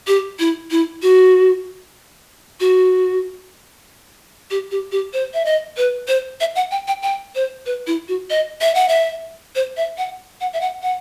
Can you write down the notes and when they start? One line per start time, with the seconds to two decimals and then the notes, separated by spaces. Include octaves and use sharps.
0.07 G4
0.39 E4
0.71 E4
1.03 F#4
2.60 F#4
4.51 G4
4.71 G4
4.92 G4
5.13 C5
5.34 E5
5.45 D#5
5.77 B4
6.08 C5
6.40 E5
6.56 F#5
6.71 G5
6.88 G5
7.03 G5
7.35 C5
7.66 B4
7.87 E4
8.08 F#4
8.30 D#5
8.61 E5
8.75 F#5
8.88 E5
9.56 C5
9.77 E5
9.98 F#5
10.41 F#5
10.53 E5
10.61 F#5
10.83 F#5